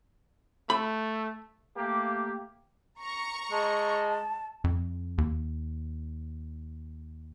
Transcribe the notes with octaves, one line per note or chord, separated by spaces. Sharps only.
A3 B5
A3 A#3 G4
A#5 C#6
G#3 A5
F2
D#2